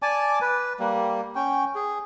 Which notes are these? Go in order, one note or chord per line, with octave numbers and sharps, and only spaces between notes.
D5 G#5 A5 D6
B4
G3 A#3
C#4 G5
G#4